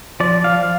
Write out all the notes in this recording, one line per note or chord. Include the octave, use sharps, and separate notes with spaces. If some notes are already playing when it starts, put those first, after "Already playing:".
F3 D5
F5